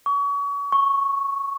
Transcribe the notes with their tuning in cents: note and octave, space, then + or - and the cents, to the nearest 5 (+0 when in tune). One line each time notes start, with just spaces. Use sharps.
C#6 +35
C#6 -5